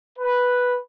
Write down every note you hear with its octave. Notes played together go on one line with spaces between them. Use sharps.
B4